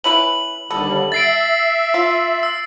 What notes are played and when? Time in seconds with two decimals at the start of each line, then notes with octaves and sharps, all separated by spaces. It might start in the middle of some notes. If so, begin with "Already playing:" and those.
0.04 C#4 E4 B4 F#7
0.70 D#2 D3 G3 B3 A4
1.12 E5 A6 C7 D7
1.94 F4
2.43 E6